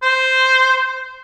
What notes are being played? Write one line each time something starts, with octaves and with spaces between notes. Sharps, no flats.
C5